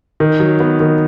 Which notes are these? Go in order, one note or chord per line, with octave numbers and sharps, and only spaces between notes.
D#3
F#3
B3
D#3